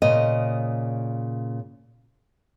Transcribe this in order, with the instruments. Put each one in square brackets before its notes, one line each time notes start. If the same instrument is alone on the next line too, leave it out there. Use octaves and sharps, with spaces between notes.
[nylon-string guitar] A#2 C#3 D#5